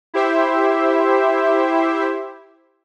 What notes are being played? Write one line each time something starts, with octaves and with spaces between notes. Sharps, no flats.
E4 G4 C5 E5